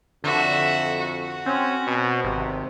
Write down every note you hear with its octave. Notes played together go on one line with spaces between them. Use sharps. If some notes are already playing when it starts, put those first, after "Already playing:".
F2 D3 F#4 E5
F#4
C4 C#4
B2
G#1 C3